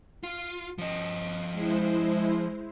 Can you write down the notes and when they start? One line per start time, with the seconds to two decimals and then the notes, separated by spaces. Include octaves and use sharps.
0.23 F4
0.78 F3 D#5
1.52 G#3 E4 C5